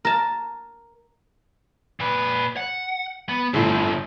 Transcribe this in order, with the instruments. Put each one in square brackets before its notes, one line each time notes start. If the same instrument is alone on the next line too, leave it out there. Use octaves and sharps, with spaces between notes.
[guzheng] A#4 A5
[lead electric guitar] A#2 B4
F#5
B3
[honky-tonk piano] G1 A2 [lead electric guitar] D3 C4